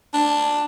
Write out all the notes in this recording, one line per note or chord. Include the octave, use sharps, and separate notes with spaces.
D4